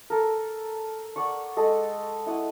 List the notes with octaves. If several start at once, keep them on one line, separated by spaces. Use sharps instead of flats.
A4 A#4
D5 F#5 C#6
G#3 A4 D#5
E4 F#5 D#6